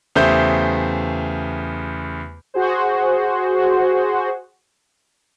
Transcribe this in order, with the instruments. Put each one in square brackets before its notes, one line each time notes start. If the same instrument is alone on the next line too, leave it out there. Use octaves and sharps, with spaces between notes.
[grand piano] E2 C#3 A3 G4 C5 G6
[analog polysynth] F#4 G#4 C5